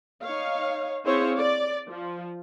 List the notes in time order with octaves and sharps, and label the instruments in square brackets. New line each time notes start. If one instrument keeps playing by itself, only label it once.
[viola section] D#4 C#5 F5
C4 E4 G#4 C5 C#5 F5
D5
F3